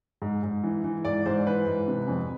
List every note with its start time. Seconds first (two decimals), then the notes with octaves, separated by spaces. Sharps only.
0.22 G#2
0.43 G#2
0.64 E3
0.84 E3
1.05 G#2 D5
1.26 G#2 C5
1.47 E3 B4
1.66 G#2
1.88 C3
2.08 F2